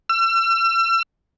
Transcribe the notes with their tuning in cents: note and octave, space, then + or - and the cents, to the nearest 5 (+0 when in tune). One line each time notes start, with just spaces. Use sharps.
E6 +40